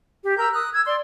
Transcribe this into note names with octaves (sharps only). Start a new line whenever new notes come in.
G4
A#4 A#5 E6 G6
D#6 F#6
E6 G#6
D5 C6